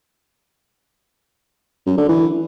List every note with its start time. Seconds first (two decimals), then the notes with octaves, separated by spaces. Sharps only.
1.86 F#2
1.97 D3
2.09 E3